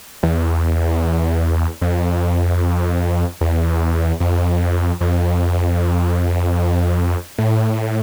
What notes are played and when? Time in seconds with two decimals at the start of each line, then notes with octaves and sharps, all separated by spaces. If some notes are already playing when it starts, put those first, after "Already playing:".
0.23 E2
1.81 F2
3.41 E2
4.20 F2
5.01 F2
7.38 A2